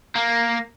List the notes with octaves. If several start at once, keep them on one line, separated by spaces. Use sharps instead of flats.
A#3